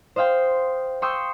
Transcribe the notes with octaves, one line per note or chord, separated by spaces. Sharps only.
C5 D#5 F5 G5 C6
G5 C6 C#6 D#6 E6 G6